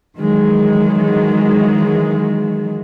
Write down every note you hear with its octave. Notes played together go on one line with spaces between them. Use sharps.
D#3 E3 F#3 G#3